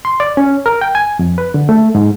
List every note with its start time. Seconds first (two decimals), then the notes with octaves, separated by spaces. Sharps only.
0.05 C6
0.20 D5
0.37 C#4
0.66 A#4
0.81 G5
0.95 G#5
1.19 F2
1.38 B4
1.54 D3
1.69 A3
1.95 G#2